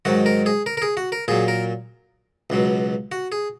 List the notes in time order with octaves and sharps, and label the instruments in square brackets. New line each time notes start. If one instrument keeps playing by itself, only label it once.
[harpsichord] G#2 D#3 F#3 F#4
A#4
G#4
A#4
A#4
G#4
F#4
A#4
A#2 F#3 G#4
A#4
C#2 B2 F#3
F#4
G#4